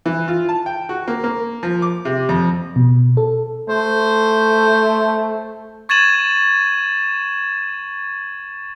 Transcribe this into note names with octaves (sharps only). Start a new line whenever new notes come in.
E3
F4
A5
G5
F#4
A#3
A#3
F3
D6
C3
F2
B2
A4
A3 C5
C#6 G#6 A6 D#7 E7 F#7